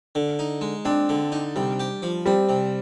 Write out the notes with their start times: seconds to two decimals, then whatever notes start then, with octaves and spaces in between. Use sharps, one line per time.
0.15 D3
0.39 D#4
0.61 G#3
0.85 C4 D4
1.09 D3
1.32 D#4
1.56 C3 G3
1.80 G4
2.03 F3
2.25 G3 C4
2.49 C3